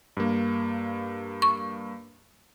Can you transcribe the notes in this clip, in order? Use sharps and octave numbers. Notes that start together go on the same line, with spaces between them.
G2 A#3
C#6